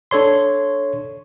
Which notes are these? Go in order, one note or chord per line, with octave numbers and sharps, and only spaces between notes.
D4 A4 C#5 C6